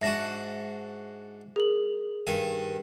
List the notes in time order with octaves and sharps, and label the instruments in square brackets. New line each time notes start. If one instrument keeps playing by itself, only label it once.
[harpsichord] G#2 D4 F#4 [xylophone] E5 A#6
[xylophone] G#4 A#4 F#7
[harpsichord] G2 D#3 G#5